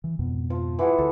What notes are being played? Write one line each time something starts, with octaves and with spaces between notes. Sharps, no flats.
E3
F2 G#2 B2
F3
E3 F#4 G#4
D2 A4